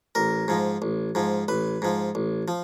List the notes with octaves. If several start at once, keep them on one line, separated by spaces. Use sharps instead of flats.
A1 A#4
G#2 F3
A1
G#2 F3
A1 B4
G#2 F3
A1
F3